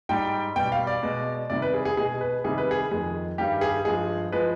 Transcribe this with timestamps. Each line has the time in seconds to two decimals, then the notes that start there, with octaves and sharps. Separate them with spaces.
0.09 G#2 G3 G5
0.56 B2 G3 G5
0.72 F5
0.87 D5
1.03 B2 G#3
1.50 C3 D#3 G3 D5
1.62 B4
1.74 G#4
1.85 G#4
1.97 B2 G#3 G#4
2.21 B4
2.44 C3 D#3 G3 G#4
2.58 B4
2.71 G#4
2.91 F2 D#3 G#3 G#4
3.38 G2 D#3 G3 G4
3.61 G#4
3.85 G2 F3 G#3 G#4
4.32 F3 G#3 B4